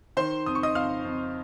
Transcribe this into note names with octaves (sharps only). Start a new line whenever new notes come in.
D#3 C5 C6
F2 D#6
C#6
D#5 D#6
F2 F5 F6
F2